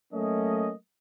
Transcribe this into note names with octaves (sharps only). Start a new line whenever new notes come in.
F#3 A3 A#3 C#4 D#5